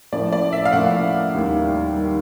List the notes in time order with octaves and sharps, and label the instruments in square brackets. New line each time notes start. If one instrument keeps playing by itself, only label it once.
[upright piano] A2 F3 A#3 C#4 E4 [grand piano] D5
[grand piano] D5
E5
F5
[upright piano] A2 F3 A#3 C#4 E4 [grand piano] F#5
[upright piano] D#2 D#3 G3
D#3 G3